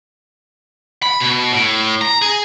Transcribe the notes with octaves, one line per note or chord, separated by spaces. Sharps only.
B5
B2
A2
A#5
G#4